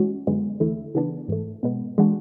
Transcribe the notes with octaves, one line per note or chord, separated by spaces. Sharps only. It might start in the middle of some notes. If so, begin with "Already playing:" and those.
Already playing: E3 G#3 C#4 F#4
F#2 D3 G#3 B3
E2 D3 A3 E4
C#3 E3 B3 D4
G#2 E3 A3
B2 G#3 B3
E3 G#3 D4 F#4